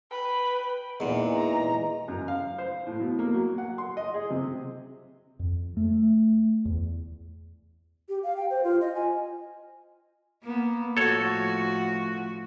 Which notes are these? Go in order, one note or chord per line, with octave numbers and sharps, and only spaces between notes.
B4 G5
E2 A#2 E3 G#3 D#4 F#5
A#5
F#2
F5
C5
A2
B2
A#3
F#3
F#5
C6
D#5
G#4
C3
F2
A3
E2
G4
F5
G5
C5
F4
D#5
G#5
A#3 B3
A2 F3 F#4 A4 C#5